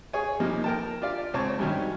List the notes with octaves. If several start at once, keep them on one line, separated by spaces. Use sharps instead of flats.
G#4 C#5 G#5
C3 F3 G3 A#3 D#4
A#4 G5 A5
F4 G4 D5 F5
C#2 C4 C#5 A5 C#6
G2 C3 D#3 F#3 C#4